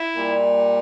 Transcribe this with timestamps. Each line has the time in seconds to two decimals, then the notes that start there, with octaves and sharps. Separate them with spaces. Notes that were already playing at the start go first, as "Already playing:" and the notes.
Already playing: E4
0.16 A#2 G3